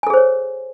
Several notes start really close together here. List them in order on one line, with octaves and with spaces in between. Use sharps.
G#5 A4 G#4 C5 C#5